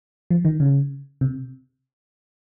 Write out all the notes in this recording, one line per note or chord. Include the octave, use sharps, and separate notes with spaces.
F3
D#3
C#3
C3